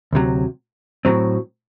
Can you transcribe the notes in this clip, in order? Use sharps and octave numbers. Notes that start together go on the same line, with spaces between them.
D2 C3 F#3
A2 F#3 C4